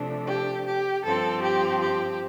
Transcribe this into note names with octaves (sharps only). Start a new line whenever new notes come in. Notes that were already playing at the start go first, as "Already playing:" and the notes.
Already playing: C3 F3 A3 D4
G4
G4
G2 F3 C4 A4
G4
G4